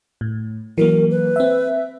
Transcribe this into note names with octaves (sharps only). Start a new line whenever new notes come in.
A2
E3 F#3 A#3 A#4
B4
C4 E5